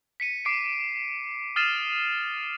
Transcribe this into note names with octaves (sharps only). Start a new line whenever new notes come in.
B6 C#7 D#7
D6 C7 D7
D#6 F6 A6 C7 D#7 E7